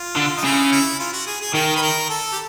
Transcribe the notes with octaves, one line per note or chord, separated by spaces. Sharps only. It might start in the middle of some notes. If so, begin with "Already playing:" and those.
Already playing: F4
D3
D#4
C#3 E4
E4
F4
F#4
G#4
G#4
D#3 A#4
B4
A#4
A4
G4